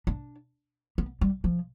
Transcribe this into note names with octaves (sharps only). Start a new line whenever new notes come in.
D4
B3
G3
F3